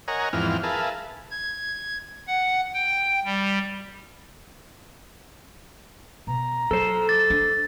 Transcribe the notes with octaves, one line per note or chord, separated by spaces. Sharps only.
A#4 C#5 D#5 F#5 G#5 A#5
E2 G#2 E3 F3 C4 F6
G#4 A#4 B4 E5 F5 A5
G#6
F#5
G5
G3
B2 A#5
F#3 A4 C5
D6 A6
D4